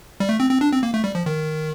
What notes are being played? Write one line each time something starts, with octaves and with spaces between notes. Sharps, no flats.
G3
A3
C4
C4
D4
C4
A#3
A3
G3
F3
D#3